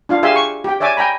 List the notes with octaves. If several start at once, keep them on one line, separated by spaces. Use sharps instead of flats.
D4 F4 F5
G4 G#4 E5 F5 G#5 C6
C#6
G4 G5
C#5 D5 E5 G#5 D6
G5 G#5 A#5 B5